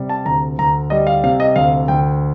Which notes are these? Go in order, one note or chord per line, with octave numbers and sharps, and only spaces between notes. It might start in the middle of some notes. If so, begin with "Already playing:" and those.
Already playing: C3 G3
A5
D2 A#5
D2 A#5
G3 D#5
F5
C3 F5
D#5
D2 F5
D2 G5